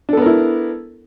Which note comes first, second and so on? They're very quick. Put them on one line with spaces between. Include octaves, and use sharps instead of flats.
D4 A4 B3 A#4 E4